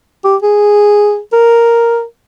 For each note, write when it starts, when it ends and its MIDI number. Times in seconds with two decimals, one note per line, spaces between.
0.25 0.37 67
0.43 1.19 68
1.33 2.04 70